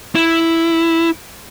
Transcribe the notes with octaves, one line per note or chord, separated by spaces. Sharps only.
E4